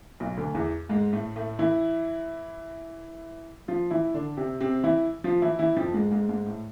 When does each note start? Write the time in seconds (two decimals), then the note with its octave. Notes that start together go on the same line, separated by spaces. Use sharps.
0.20 B1 B2
0.37 D2 D3
0.54 E2 E3
0.89 G#2 G#3
1.13 A2 A3
1.36 A2 A3
1.59 E3 E4
3.68 F3 F4
3.91 E3 E4
4.14 D3 D4
4.37 C3 C4
4.61 C3 C4
4.84 E3 E4
5.24 F3 F4
5.42 E3 E4
5.59 E3 E4
5.77 F2 F3
5.94 G#2 G#3
6.11 G#2 G#3
6.29 G#2 G#3
6.46 A2 A3